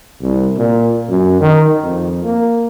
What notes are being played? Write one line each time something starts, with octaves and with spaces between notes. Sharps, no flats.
C2
A#2
F#2
D#3
F2
A#3